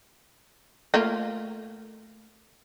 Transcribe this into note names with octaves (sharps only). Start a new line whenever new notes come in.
A3 A#3 F4